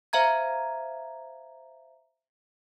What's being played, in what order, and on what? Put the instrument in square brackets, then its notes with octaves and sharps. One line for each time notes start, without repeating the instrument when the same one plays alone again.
[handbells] C5 E5 F5 A#5 G#6